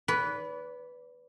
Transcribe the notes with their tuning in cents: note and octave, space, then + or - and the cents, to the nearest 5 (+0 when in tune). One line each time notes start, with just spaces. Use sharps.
B4 +0 D5 -40